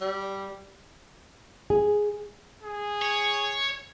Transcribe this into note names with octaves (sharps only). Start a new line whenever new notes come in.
G3
G#4
G#4
C#5